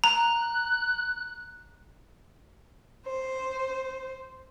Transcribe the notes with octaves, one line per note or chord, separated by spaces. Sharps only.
A#5 F#6
C5